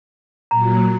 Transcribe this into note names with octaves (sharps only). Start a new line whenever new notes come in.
A#2 F#3 A#5